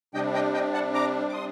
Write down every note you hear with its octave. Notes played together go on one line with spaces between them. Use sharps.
C3 G3 D4 D#5 G5
D#5 G5
D#5 G5
F#5 A5
A#5 D6
D6
C6 D#6